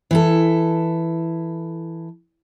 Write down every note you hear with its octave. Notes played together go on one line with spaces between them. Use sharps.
E3 E4 A4